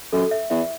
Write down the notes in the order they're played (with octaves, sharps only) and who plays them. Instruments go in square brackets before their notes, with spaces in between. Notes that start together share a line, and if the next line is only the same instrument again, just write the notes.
[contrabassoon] F#2 [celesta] A4
[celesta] E5
[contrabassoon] E2 [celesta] E5